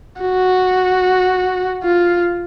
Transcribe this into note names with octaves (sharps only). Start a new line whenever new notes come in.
F#4
F4